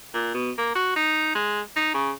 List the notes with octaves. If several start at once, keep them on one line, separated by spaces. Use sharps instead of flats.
A#2
B2
A#3
F#4
D#4
G#3
D#4
C#3